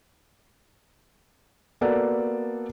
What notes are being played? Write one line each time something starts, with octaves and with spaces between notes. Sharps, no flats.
A#3 B3 F#4 A4 D5 F#5